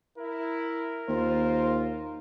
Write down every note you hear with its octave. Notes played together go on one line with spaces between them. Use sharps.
E4 A#4
D#2 F4 C5